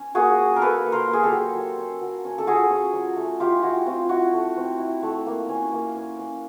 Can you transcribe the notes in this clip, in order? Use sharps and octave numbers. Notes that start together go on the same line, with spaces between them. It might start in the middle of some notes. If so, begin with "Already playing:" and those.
Already playing: C#4
A#3 F#4 G#4
C#4
A#4
A#3 A4 B4
A#3
A#4 C5
A#3
G#4
G4 A4
F#3
F#3
C#4
F#3
C#4
A4
F4 F#4 G#4
C#4
F#3
A3
E4 F4 G4
E4 F#4
C4 F4
E4 F#4
A3
C4
E4
A3
A#3
C#4
A#3
C#4
C#4